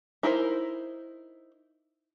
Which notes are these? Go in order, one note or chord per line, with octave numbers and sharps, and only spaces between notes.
D#4 E4 A#4 C5